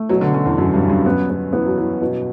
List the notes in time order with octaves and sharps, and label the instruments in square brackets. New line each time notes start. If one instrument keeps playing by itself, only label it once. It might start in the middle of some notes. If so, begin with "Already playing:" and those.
Already playing: [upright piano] A3
[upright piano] B2 [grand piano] F#3
[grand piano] D3
[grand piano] D3 [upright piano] C#4
[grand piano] E2
[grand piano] F#2 [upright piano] F#3
[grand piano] G2
[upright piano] C#4
[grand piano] G2
[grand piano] F#2 [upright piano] B3
[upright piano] B3
[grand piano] E3 [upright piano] B3
[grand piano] F#3
[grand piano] E3 [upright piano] F#4
[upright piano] B2